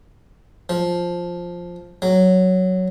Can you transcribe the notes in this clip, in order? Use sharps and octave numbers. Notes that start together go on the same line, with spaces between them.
F3
F#3